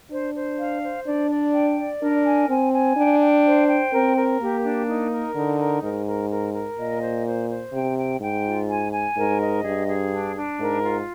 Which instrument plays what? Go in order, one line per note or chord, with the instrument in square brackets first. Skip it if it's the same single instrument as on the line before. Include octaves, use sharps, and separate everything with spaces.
[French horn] D4 [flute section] C5
[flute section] C5
F5
C5
[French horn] D4 [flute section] D5
[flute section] D5
G5
D5
[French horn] D4 [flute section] A#4
[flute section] G#5
[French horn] C4 [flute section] G#5
[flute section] G#5
[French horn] D4 [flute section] G5
[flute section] G5
C5
G5
[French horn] C4 [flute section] A#4
[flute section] A#4
[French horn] A#3 [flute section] G4
[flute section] D4
D#4
A#4
[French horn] D3 [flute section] D#4
[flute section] A#4
[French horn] G#2 [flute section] A#4
[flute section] A#4
A#4
A#4
[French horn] A#2 [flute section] D#5
[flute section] C5
C5
C5
[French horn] C3 [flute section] G5
[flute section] G5
[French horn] G#2 [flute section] G5
[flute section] F4
G#5
G#5
[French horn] G#2 [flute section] A#4
[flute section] D#5
[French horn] G2 [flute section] G#4
[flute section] G#4
D4
D4
[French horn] G#2 [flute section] A#4
[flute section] F4